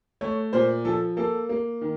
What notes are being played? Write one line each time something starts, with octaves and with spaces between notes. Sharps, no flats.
A3 C#5
A#2 C5
F3 A4
A#3 A4
A#3
D#3